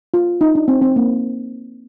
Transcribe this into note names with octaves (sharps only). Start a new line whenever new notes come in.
F4
D#4
D4
C4
C4
A#3